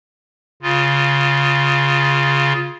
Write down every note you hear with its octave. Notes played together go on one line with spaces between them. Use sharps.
C#3 F4